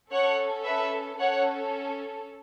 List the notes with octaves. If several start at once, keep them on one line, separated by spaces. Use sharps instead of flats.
C#4 A4 C#5 F#5
B4 E5
C#4 A4 C#5 F#5